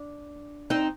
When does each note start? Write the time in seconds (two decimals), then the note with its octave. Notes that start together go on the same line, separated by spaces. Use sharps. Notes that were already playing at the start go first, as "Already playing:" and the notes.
Already playing: D4
0.70 C4 D#4